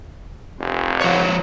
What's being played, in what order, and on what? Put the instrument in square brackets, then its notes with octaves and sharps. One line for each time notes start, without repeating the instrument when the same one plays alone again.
[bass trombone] F1
[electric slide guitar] F3 C#5